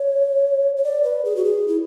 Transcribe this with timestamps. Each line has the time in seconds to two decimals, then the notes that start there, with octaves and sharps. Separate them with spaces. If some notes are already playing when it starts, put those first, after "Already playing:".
Already playing: C#5
0.77 C#5
0.84 D5
1.04 B4
1.25 G#4
1.36 F#4
1.45 G#4
1.68 E4